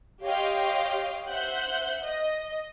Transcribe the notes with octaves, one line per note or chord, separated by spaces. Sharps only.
G4 C#5 D#5 F5 G5 C6
C5 E5 F#5 F#6 G6
D#5